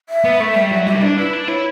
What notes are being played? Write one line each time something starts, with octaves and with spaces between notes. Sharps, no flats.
E5
B3
A3
G3
F#3
G3 E5
E4
D4 D5
E4 B4
D4
E4 C#5